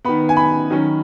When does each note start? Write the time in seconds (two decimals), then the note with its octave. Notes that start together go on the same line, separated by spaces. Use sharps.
0.05 D#3 B3 B5
0.29 G#5
0.37 B5
0.70 D#3 F#3 C#4